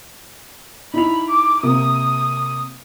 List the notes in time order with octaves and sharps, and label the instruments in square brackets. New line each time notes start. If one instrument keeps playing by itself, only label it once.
[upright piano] D#4 E4 F7 [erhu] B5
[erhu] D6
[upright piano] C3 A#3 [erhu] D#6